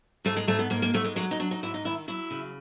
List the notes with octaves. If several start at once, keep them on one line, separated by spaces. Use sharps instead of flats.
G#2 A3
G#3
G#2 A3
B3
G#2 A#3
A#3
G#2 A3
G#3
F#3 G#3
D#4
F#3 D4
D#4
G#2 E4
D#4
D#3 E4
F#3 E4
C#3